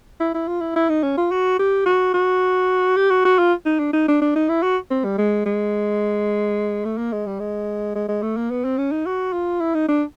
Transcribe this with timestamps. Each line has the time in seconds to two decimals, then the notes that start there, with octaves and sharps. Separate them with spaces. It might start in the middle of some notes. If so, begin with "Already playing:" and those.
0.20 E4
0.35 E4
0.48 F4
0.61 E4
0.76 E4
0.89 D#4
1.03 C#4
1.18 F4
1.31 F#4
1.59 G4
1.86 F#4
2.14 F#4
2.97 G4
3.10 F#4
3.25 F#4
3.39 F4
3.66 D#4
3.79 D4
3.93 D#4
4.08 D4
4.22 D4
4.36 D#4
4.49 E4
4.63 F#4
4.91 C4
5.05 G3
5.18 G#3
5.46 G#3
6.85 A3
6.98 A#3
7.13 G#3
7.26 G3
7.40 G#3
7.96 G#3
8.09 G#3
8.23 A3
8.37 A#3
8.51 B3
8.65 C4
8.78 C#4
8.92 D#4
9.06 F#4
9.33 F4
9.61 E4
9.75 D#4
9.89 D4